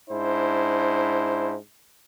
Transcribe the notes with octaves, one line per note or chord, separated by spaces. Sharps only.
G#2 D4 E4 C5